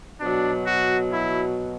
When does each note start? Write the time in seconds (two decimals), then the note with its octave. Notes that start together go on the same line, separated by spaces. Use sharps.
0.20 B2 D4
0.26 F#3
0.66 F#4
1.13 E4